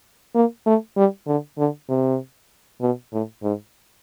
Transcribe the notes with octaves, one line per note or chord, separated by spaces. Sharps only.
A#3
A3
G3
D3
D3
C3
B2
A2
G#2